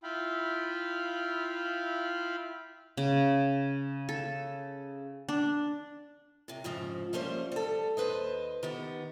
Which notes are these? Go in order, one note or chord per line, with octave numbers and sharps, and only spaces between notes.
E4 F4 F5 G5 B5
C#3
A4
D4
A2 C3
F2 G#2 C#3 F3
F3 G3 A3 A#3 C#4 C5
G3 A4
D#2 B4 C5 D#5
D#3 B3 G4